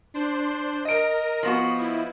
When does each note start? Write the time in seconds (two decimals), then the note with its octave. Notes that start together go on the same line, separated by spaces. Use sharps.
0.14 D4 C5 C6
0.85 A#4 D#5 A#6 D7
1.43 F3 B3 F#4
1.79 E4